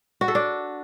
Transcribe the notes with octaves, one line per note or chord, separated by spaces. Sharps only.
F#4
A4
D4